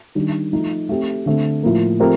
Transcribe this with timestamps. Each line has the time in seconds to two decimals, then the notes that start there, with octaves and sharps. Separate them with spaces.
0.15 D#3 G3 D4
0.53 F3 A3 D#4
0.89 A3 C4 G4
1.26 D3 A3 C4
1.63 A2 F3 A#3
2.00 F3 A3 C4 G4 A#4